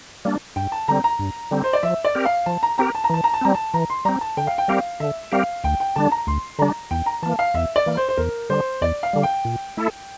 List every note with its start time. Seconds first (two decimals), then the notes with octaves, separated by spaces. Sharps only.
0.25 G3 A#3 D4
0.56 G2 G5
0.72 A5
0.88 D3 G3 C4 A#5
1.04 A#5
1.19 G2
1.51 D3 G3 C4
1.64 C5
1.73 D5
1.83 F3 E5
2.04 D5
2.15 C4 G4 A#4
2.25 F5
2.46 F3 A5
2.63 A#5
2.78 C4 G4 A#4 A#5
2.95 A5
3.04 A#5
3.10 E3 A5
3.24 A#5
3.34 A5
3.41 G3 C4 A#5
3.54 A5
3.74 E3 A#5
3.90 C6
4.05 G3 C4 A#5
4.21 A5
4.37 D3 G5
4.47 F5
4.58 G5
4.68 G3 C4 G4 A#4 F5
5.00 D3 E5
5.32 G3 C4 G4 A#4 F5
5.64 D2 G5
5.80 G5
5.96 D3 G3 D4 A5
6.12 A#5
6.27 D2 C6
6.59 D3 G3 D4 A#5
6.91 E2 G5
7.06 A#5
7.22 E3 A#3 A5
7.39 F5
7.54 E2 E5
7.76 D5
7.86 E3 A#3
7.97 C5
8.09 C5
8.17 E2 A#4
8.50 D3 G3 C5
8.81 E2 D5
9.03 F5
9.13 D3 G3
9.23 G5
9.45 A#2
9.77 A3 E4 A4